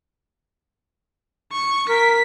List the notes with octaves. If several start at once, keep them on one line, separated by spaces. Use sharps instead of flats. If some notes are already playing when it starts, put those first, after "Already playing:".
C#6
A#4 B6